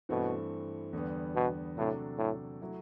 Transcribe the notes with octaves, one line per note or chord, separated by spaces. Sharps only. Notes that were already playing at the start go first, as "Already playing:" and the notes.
G2 B2 E3 A3 C4
E2 D3 G3 B3
B2
A2 C3 F#3 A3 D4 A4
A2
F#3 A3 E4